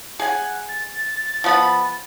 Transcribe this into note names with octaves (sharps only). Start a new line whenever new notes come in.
G#4 F#5 G#5
A6
F3 B3 B5